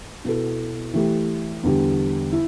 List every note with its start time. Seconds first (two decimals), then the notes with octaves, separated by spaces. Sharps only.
0.24 B2 B3 E4 A4
0.94 E3 A3 G4
1.63 E2 D3 G3
2.33 E4